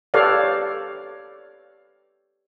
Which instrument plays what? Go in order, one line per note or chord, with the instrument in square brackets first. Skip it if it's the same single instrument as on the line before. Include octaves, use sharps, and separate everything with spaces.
[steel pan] G4 A4 B4 C#5 D5 F5